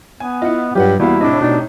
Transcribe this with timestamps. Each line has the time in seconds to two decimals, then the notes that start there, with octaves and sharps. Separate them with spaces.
0.20 B3 G#5
0.42 E4 F4 D#5 F#5
0.75 G2 F#3 G3 F4 G4 B4 F#5
0.99 E2 G3 A#3 B3 E4 F#4 F5
1.21 A2 C3 D4 D#5
1.41 B2 D#4 D5